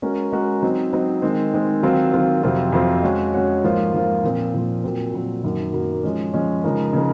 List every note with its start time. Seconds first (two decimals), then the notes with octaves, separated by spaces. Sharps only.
0.02 G#3 C#4 F#4 A#4
0.32 G#3 C#4 F#4 A#4
0.62 F#3 C4 D#4
0.93 F#3 C4 D#4
1.22 D#3 G#3 C4
1.54 D#3 G#3 C4
1.83 D#3 F#3 C4 F4
2.13 D#3 F#3 C4 F4
2.43 F2 C3 F#3 C4 F4
2.73 F2 C3 F#3 C4 F4
3.03 G#3 C#4 F#4 C#5
3.33 G#3 C#4 F#4 C#5
3.64 G#2 F3 A#3 F4 C5
3.93 G#2 F3 A#3 F4 C5
4.23 A#2 F3 C4
4.54 A#2 F3 C4
4.84 A#2 F#3 C4
5.13 A#2 F#3 C4
5.44 F#2 D#3 F#3 A#3
5.73 F#2 D#3 F#3 A#3
6.03 F3 G#3 C#4
6.34 F3 G#3 C#4
6.64 C#3 F3 G#3 D#4 A#4
6.93 C#3 F3 G#3 D#4 A#4